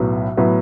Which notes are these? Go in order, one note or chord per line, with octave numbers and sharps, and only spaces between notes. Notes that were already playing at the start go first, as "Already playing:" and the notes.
Already playing: B1 A2 F#3 B3
A2 F#3 B3